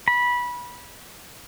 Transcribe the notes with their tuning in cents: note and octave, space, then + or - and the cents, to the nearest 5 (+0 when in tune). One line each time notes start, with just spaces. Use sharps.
B5 -20